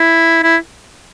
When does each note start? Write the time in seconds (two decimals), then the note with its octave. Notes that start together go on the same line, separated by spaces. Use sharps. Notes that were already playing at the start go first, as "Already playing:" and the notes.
Already playing: E4
0.43 E4